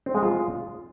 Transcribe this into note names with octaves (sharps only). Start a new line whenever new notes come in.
C4
G#3
F4